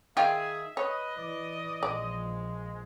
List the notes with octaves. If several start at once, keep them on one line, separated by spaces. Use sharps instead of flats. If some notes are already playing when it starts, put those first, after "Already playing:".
D#3 F4 G#4 E5 G5
B4 C#5 D#5
E3 D5
A#1 F3 G#3 D5